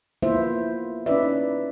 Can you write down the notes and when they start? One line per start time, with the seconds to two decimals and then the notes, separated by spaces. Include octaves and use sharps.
0.22 A#3 B3 E4 F4 C5 E5
1.06 C#4 D#4 E4 B4 D5 E5